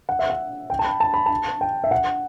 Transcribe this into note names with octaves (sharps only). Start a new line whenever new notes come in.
F#5
E5
F#5
G5
A5
B5
A5
B5
A5
G5
E5
F#5